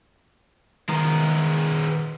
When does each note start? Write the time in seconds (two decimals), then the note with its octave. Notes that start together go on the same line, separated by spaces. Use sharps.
0.89 D#3 G#3 B3 A#5